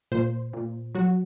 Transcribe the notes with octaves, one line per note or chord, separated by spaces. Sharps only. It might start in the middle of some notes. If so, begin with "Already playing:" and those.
A#2 C5
A#2
F#3 F#4